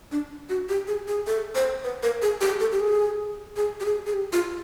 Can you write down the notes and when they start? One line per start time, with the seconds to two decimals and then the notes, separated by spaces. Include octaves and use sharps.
0.12 D4
0.49 F#4
0.69 G4
0.87 G#4
1.08 G#4
1.27 A4
1.55 C5
1.84 B4
2.03 A#4
2.22 G#4
2.41 G4
2.60 A4
2.72 G4
2.80 G#4
3.57 G#4
3.80 G4
3.85 G#4
4.07 G#4
4.14 G4
4.33 F4